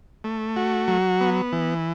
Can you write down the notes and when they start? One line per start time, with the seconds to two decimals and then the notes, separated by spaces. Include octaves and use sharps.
0.24 A3
0.56 F#4
0.88 F#3
1.20 B3
1.52 E3